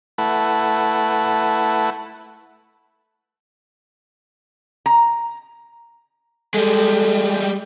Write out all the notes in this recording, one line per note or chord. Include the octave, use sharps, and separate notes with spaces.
A3 E4 B4 F#5
A#5
G3 G#3 A4